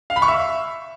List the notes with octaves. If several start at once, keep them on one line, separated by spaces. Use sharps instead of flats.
F5
B5
C#6
E5